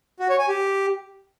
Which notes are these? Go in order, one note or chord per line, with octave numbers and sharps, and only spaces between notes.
F#4
C#5
G#5
G4